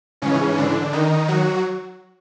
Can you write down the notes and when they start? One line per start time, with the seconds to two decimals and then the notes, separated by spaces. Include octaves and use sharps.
0.22 G#2 C#3 E3 C#4
0.57 D3 D4
0.93 D#3 D#4
1.28 F#3 F#4